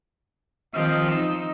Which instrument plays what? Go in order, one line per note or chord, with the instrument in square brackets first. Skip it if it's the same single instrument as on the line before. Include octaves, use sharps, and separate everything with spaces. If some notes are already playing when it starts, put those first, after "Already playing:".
[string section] D#3 [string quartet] F3 C4 G4 [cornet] D#5
[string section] D#4 [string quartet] E6